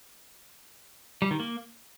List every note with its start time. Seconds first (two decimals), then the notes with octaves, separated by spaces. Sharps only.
1.22 G3
1.31 D#3
1.40 A#3